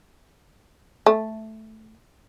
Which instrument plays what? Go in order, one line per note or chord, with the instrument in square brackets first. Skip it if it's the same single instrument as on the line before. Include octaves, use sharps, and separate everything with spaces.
[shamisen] A3